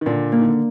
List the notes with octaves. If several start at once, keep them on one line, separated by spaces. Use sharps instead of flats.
D#3
A#2 D3 D4
A#3
D#3
D3